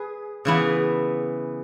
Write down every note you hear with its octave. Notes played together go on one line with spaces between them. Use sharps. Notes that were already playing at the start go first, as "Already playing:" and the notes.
Already playing: G#4 B4
C#3 E3 B3 E4